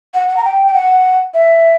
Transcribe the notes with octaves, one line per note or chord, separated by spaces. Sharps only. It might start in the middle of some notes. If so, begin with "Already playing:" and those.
F#5
F#5
A#5
G5
G5
F#5
E5